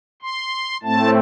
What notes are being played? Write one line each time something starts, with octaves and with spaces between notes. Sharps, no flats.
C6
A2 A3 C4 A5